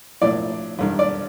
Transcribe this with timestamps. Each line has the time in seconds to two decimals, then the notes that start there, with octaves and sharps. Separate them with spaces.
0.22 A#1 A2 D5
0.79 A1 G2 D#3
0.99 D5